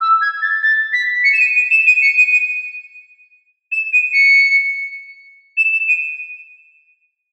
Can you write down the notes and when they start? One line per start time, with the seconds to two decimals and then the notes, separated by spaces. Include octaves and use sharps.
0.01 E6
0.21 G#6
0.42 A6
0.63 A6
0.93 B6
1.24 C#7
1.33 E7
1.40 D#7
1.56 D#7
1.71 E7
1.87 D#7
2.02 C#7
2.17 D#7
2.32 D#7
3.72 E7
3.93 D#7
4.13 C#7
5.57 E7
5.73 E7
5.88 D#7